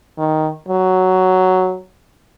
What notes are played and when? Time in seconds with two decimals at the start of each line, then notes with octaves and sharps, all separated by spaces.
0.18 D#3
0.69 F#3